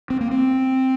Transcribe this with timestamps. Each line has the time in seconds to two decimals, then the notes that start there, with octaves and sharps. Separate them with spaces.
0.10 C4
0.21 A#3
0.31 C4